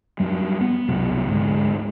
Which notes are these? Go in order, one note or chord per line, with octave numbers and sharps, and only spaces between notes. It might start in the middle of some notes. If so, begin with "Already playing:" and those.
F#2 G3
B3
C2 F#2 B2
D2 G#2